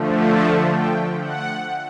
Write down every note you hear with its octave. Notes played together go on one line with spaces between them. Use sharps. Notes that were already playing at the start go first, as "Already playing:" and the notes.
Already playing: D3 F3 A3
A5
G5
F#5